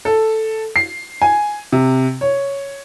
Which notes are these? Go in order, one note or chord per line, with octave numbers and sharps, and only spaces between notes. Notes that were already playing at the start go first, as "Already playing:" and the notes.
A4
C7
G#5
C3
C#5